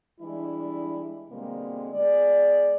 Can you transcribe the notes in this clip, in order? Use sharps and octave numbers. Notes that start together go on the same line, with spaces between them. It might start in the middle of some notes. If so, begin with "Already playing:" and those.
E3 G3 G#3 D4 E4
B2 D3 G3 G#3 A#3 C4
G#3 B3 G#4 D5